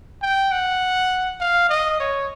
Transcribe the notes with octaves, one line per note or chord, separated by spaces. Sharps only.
G5
F#5
F5
D#5
C#5